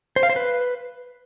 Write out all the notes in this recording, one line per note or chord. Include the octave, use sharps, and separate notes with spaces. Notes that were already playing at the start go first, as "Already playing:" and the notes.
C5
F5
C5
B4